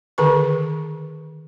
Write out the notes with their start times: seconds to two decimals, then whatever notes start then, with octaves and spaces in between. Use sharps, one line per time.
0.18 D3 D#3 A#4 B4 C#6